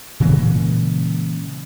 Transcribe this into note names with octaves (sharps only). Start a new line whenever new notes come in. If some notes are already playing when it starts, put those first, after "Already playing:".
A#2 C#3 E3 G#3